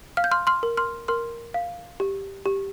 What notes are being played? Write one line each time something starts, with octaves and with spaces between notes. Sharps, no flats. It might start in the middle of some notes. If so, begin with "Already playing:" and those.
F5 F6
G6
C6 F6
C6 F6
A#4
C6 F6
A#4 C6 F6
F5
G4
G4